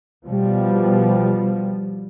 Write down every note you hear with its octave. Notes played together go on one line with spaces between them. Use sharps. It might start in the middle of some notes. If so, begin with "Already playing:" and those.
B2 F3 G3